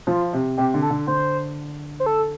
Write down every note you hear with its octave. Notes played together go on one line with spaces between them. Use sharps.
F3 F4
C3
C3 G4
D3
A4
D3
D3 C5
C5
A4